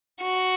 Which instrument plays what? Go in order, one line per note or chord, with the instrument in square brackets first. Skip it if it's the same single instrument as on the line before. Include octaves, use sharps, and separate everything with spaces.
[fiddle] F#4